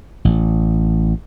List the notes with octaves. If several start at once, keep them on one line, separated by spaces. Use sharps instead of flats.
A1